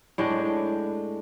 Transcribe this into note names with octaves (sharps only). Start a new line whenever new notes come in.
A2 G#3 D4